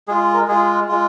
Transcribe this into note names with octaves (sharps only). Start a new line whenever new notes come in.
G#3 F4 G#4
A#4
G#3 F4 G#4
G#3 F4